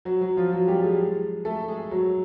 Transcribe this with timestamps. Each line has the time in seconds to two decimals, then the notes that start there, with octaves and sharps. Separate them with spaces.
0.05 F#3 F#4
0.21 F#3 F#4
0.37 F3 F4
0.52 F#3 F#4
0.68 G3 G4
0.83 G#3 G#4
1.45 A3 A4
1.68 G#3 G#4
1.91 F#3 F#4